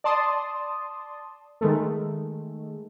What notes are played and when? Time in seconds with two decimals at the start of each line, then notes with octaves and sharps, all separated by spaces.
0.04 D5 A5 C6 D#6
1.61 D#3 G#3 A3